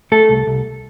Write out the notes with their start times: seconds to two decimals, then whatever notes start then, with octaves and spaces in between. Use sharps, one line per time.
0.12 A3 A4
0.29 C2
0.47 C2